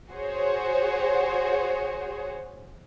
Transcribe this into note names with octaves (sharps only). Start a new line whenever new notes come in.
F#4 G#4 C5 C#5